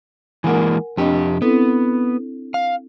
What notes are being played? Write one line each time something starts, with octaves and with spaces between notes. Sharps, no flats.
E3 G#3 A#3 A#4 F#5 G#5
F2 C4 D4 G4 D#5
B3 C4 E4 A4
F5